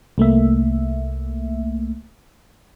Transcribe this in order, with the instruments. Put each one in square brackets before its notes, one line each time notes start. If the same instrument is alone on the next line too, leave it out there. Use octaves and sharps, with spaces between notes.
[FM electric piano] C2 A3 A#3 E5